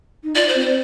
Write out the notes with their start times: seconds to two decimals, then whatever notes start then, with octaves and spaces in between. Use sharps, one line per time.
0.24 D#4
0.35 F4 D5
0.48 C5
0.55 C4
0.61 C5